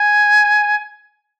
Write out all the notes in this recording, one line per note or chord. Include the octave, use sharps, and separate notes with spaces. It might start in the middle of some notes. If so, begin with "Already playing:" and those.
Already playing: G#5